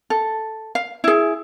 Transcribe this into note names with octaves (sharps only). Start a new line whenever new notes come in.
A4
F5
E4 G#4